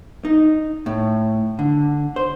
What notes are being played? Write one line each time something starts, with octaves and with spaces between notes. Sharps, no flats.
D#4
A2
D3
C5